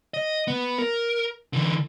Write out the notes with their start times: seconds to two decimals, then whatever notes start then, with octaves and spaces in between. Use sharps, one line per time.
0.14 D#5
0.47 B3
0.79 A#4
1.53 D3 E3